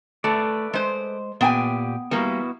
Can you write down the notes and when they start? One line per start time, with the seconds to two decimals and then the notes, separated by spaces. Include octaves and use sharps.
0.24 A3 A4 B4 D5
0.73 G#3 C5
1.41 A#2 B3 G4 G5 G#5
2.11 G3 A#3 B3 E4 F#4